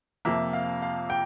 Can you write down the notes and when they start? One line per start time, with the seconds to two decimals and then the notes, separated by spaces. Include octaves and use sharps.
0.25 F2 C3 F3 A#3 E5
0.53 F5
0.82 F5
1.10 G5